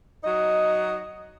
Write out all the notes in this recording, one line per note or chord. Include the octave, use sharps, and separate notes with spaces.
F#3 D#4 D#5